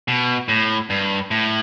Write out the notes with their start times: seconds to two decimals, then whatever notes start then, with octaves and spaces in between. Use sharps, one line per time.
0.08 B2
0.48 A2
0.90 G2
1.31 A2